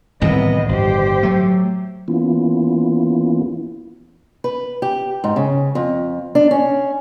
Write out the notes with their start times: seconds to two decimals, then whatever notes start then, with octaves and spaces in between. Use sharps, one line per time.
0.22 C2 A2 C3 D#3 E3 B3 D#5
0.69 G1 G4 C5
1.23 F#3 A3
2.08 E3 A#3 B3 C#4 E4 F4
4.44 B4
4.82 G4
5.24 G#2
5.36 C#3
5.75 F2
6.35 D4
6.51 C#4